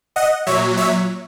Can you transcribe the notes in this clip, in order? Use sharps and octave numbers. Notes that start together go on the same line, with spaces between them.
D#5 F#5
A#2 F#3 C#5 E5
C#5 E5